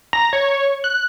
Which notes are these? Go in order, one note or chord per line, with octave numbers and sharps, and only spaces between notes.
A#5
C#5
F#6